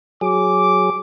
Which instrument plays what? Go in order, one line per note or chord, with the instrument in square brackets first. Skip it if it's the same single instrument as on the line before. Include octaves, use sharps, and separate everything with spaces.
[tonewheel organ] F#3 G#4 [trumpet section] D6